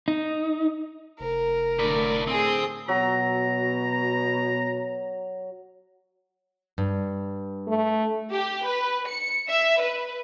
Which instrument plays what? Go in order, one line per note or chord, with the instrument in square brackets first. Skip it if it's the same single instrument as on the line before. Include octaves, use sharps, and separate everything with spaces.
[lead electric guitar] D#4
[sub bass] F1 [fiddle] A#4
[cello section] A2 D3 A3 [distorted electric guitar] B4 D5
[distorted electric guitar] C4 [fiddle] G#4 D#6
[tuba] B2 [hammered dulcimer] F#3 [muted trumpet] A#5
[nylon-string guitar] G2
[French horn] A3
[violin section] G4
B4
C#7
E5
B4